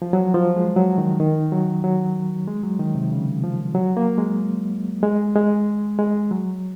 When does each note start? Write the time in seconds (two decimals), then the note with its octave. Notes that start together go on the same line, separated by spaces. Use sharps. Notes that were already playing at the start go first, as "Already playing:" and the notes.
0.02 F3
0.13 F#3
0.35 F3
0.56 G#3
0.76 F#3
0.98 D#3
1.20 D#3
1.52 F#3
1.84 F#3
2.48 G#3
2.63 F#3
2.79 D#3
2.95 C3
3.12 C#3
3.44 F3
3.75 F#3
3.97 A#3
4.18 G#3
5.03 G#3
5.36 G#3
5.99 G#3
6.31 F#3